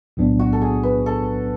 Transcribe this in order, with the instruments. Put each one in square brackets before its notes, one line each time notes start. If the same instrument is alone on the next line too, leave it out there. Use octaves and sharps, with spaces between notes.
[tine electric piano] B1 A2 F#3 B3 D4
[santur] F#4
A4
G#4
B4
A4